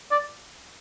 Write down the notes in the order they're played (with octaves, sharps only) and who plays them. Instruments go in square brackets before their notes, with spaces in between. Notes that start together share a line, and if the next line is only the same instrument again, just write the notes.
[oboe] D5